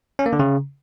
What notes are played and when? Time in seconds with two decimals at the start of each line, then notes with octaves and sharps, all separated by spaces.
0.19 C#4
0.26 A#3
0.33 D3
0.39 C#3